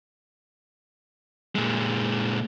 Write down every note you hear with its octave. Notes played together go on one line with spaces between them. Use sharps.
A#2 G#3